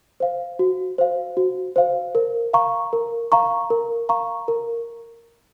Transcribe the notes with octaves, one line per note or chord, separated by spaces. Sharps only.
C5 F5
F#4
C5 F5
F#4
C5 F5
A#4
F5 A#5 C#6
A#4
F5 A#5 C#6
A#4
F5 A#5 C#6
A#4